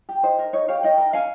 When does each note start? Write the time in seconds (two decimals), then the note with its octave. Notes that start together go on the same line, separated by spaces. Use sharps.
0.09 G4
0.23 D#4 C5
0.39 A#4
0.53 D#4 C#5
0.68 G4 C#5 F5
0.83 D#4 D#5 G5
0.98 A#4
1.13 C#4 F5 G#5